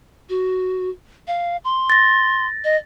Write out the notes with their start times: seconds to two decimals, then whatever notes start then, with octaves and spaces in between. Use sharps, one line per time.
0.29 F#4
1.28 F5
1.64 C6
1.90 A6 A#6
2.64 D#5